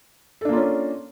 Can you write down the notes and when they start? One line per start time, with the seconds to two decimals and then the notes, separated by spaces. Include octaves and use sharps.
0.41 A4
0.45 D4
0.49 A#3
0.53 F4
0.57 C#4